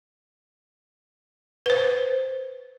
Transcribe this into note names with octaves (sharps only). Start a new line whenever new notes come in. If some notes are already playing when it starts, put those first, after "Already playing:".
B4 C5